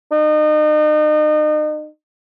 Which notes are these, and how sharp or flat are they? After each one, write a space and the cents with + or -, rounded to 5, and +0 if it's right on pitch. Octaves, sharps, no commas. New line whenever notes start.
D#4 -35